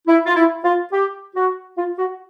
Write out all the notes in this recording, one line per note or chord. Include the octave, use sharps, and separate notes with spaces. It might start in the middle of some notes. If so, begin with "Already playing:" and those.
E4
F4
E4
F4
G4
F#4
F4
F#4